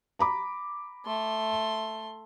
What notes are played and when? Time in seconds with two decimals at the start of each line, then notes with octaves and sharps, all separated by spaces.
0.19 A#5 B5 D6
1.06 A3 C6